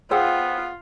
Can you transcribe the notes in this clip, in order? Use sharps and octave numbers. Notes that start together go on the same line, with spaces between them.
B3 F4 G#4 C5 F#5 G5 E6